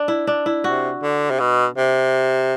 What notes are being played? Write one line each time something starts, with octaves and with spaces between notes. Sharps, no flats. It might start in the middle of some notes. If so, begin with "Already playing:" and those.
Already playing: D4
E4
D4
E4
C3 F#4
D3
C3
B2
C3